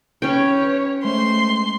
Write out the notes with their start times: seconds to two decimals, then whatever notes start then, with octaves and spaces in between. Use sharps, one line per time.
0.22 C#4 B4 C#5 G5
1.04 G#3 A3 C5 C6